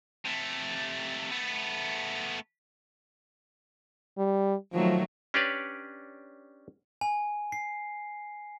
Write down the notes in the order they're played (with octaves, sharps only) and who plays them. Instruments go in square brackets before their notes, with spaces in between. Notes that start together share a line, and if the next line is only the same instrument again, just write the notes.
[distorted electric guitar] C3 A3
A3 B3
[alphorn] G3
[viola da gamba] D#3 F#3 A3 [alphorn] F3
[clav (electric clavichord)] C#4 D4 G4 B4 C#5 D5
[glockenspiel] G#5
C7